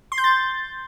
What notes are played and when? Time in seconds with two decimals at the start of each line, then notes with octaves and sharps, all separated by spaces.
0.12 C6
0.18 G6
0.24 A6